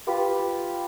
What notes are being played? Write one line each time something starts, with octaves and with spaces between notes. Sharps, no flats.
F4 G4 B4